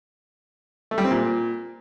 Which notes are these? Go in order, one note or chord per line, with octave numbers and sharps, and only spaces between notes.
A3
G3
C4
A#2